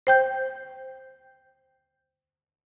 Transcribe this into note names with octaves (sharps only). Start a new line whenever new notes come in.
C5 G5 G6